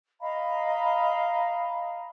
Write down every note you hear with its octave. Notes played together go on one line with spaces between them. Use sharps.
D#5 F5 A#5 B5